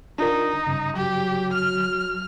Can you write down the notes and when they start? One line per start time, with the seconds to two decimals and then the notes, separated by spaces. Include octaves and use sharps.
0.19 D4 D#4 F4 A#4
0.67 G2 C#3
0.96 F#3 G4
1.53 F6